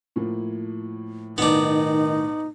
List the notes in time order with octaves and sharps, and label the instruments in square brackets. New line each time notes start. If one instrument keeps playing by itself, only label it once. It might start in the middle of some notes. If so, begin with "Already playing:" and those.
[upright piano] A2 F3 A#3
[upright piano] B1 A2 [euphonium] D#3 [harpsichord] B3 D4 [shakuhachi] D#4